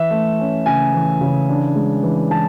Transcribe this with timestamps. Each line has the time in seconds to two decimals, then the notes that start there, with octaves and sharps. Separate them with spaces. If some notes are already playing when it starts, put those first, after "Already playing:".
Already playing: E3 E5
0.10 A3
0.39 C#4
0.66 C#3 G#5
0.94 E3
1.21 C#3
1.49 D4
1.75 G#3
2.03 E3
2.31 E3 A5